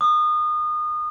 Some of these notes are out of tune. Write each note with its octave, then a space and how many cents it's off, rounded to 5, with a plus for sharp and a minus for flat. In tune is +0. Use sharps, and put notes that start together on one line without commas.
D#6 -30